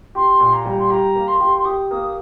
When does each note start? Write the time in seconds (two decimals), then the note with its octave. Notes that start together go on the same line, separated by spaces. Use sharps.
0.15 G4 C6
0.40 A#2
0.53 A#5
0.65 G3
0.79 C6
0.90 G4 A#5
1.15 A#3
1.28 C6
1.40 G4
1.57 C6
1.65 G4 D#6
1.90 A#3 D#6